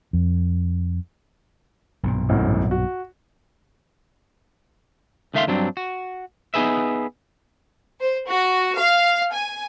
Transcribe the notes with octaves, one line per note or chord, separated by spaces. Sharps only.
F2
B1 G2 A#2
G#1 F#2 A2
F#4
C#2 D#3 A3 E5 F5 C6
G2 F#3 C4 D4
F#4
B3 D#4 G#4 B4 E5
C5
F#4
F5
G#5